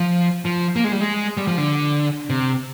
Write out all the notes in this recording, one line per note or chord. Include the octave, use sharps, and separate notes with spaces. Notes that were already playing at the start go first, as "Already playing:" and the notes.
Already playing: F3
F3
A#3
G#3
G3
G#3
G3
F3
D3
C3